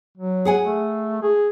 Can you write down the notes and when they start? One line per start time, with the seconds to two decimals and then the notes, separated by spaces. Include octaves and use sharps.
0.17 F#3
0.45 G#4 F#5 G#5
0.61 A3
1.22 G#4